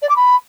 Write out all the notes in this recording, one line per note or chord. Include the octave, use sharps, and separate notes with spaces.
D5
D6
B5